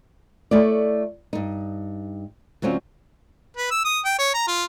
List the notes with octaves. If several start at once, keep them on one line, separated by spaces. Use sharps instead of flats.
A3 E4 C#5 D5
G2 D#4
D2 F#3 C4 C#4 F4
B4
E6
D#6
G5
C#5
A#5
F4